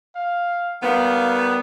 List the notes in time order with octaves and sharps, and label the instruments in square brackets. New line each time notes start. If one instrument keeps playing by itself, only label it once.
[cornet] F5
[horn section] D#3 G3 B3 [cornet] F5